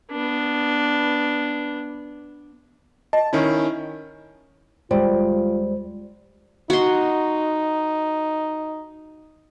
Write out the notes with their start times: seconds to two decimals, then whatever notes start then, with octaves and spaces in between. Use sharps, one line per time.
0.11 B3 D4
3.13 D#5 A5
3.33 D#3 C#4 E4
4.91 D#2 G3 G#3 F4 C5
6.70 D#4 F#4 C6